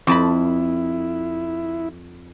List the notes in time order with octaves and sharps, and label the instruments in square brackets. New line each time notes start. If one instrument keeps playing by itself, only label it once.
[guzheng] F2 A5 B5 [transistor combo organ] E4